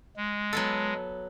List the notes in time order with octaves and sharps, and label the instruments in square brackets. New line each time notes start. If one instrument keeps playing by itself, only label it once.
[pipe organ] G#3
[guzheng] F#3 B3 A4